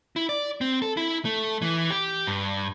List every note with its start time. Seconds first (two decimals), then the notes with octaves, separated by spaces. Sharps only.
0.16 E4
0.29 D5
0.61 C4
0.82 A4
0.97 E4
1.25 A3
1.62 E3
1.91 G4
2.27 G2